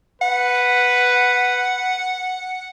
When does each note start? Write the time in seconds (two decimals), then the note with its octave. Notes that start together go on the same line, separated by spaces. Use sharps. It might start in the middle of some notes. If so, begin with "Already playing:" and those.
0.22 B4 F#5